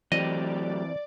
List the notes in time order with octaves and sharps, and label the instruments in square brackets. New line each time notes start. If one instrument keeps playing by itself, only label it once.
[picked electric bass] E3 C4 [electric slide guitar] F#3 A3 G4 [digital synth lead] D5 [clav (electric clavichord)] D#5